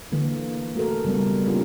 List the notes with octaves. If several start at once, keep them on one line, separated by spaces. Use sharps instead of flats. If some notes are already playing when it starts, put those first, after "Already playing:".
D3 E3 A#3
A3 F#4 A4 A#4
C#3 G3 B3
A#3 C#4 D4 E4 F4 G4